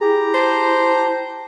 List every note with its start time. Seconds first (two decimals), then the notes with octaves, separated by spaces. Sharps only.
0.01 E4 G4 G#4 A#5
0.34 C5 A5